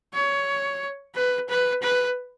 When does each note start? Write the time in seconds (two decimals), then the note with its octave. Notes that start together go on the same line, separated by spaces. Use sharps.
0.14 C#5
1.15 B4
1.49 B4
1.82 B4